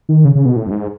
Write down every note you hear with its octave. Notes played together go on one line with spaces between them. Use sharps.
D#3
C#3
C#3
B2
A2
F#2
G#2